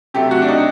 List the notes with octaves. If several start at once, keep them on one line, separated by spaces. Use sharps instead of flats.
C3 F#3 A3 G4
F#4
D4
D#4